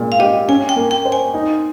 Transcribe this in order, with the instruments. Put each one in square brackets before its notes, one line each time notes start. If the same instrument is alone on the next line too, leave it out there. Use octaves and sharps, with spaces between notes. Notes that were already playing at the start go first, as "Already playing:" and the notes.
Already playing: [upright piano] A#2 G#3
[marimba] F5
[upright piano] G4 [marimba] D#5
[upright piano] C#4 [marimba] G#5
[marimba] G5
[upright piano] A#3
[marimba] G5
[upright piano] C5
[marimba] G#5
[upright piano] D#4